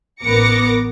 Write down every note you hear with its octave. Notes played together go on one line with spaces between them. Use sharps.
A1 B3 A#4 D6 A#6 C#7